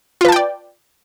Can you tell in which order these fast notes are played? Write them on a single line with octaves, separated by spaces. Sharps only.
F4 B4 A5 G5 D5